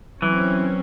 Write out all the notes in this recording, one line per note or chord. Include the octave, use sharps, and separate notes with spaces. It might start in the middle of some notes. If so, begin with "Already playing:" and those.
E3 F#3 C4 C#4